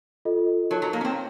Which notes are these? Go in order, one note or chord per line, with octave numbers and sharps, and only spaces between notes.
F4 A4 D#5
F#3 D#4 A#4 C#5 A5
F#3
A#3
C#4
C4